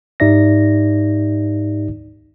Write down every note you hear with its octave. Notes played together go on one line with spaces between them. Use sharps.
G#2 D#4 G4 D5 E5 A#6